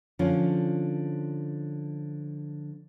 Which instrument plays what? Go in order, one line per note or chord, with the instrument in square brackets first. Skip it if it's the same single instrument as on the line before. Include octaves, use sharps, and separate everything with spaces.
[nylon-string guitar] D3 F3 C#4 F4